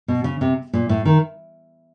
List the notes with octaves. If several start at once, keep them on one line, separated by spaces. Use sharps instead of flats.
B2
C#3
C3
A#2
A2
D#3